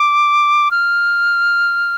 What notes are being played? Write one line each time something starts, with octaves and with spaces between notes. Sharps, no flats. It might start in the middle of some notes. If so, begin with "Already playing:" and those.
Already playing: D6
F6